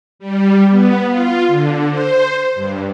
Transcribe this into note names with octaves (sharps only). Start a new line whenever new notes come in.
G3
B3
F4
D3
C5
G2